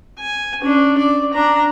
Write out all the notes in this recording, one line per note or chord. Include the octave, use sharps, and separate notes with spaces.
G#5
C#4 D4
D5
D4 A#5